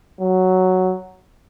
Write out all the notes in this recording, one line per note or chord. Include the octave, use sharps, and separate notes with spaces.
F#3